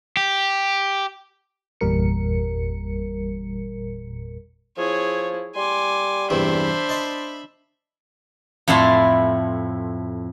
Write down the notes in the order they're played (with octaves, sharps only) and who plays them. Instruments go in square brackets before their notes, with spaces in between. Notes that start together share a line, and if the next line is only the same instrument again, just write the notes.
[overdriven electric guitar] G4
[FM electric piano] G1 E2 A#2 G3 A#4 C#7
[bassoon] F3 [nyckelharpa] E4 G#4 [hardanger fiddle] C#5
[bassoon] G3 [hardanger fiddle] G#5 [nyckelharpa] C6 D6
[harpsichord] E2 G2 C3 [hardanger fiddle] D4 C5 [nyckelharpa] E5 B5
[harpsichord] D#5 A5 C6
[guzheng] F2 A2 E4 A5 C6